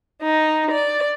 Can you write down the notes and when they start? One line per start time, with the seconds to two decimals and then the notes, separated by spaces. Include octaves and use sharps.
0.22 D#4
0.70 D5